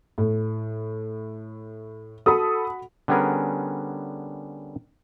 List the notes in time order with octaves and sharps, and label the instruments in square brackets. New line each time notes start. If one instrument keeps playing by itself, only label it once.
[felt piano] A2
[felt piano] F#4 B5 [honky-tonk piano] A4 D#6
[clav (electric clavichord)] D3 G3 B3 C#4 G#4 A#4